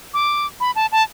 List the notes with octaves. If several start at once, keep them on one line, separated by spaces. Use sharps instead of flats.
D6
B5
A5
A5